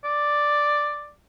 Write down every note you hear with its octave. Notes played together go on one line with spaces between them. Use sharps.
D5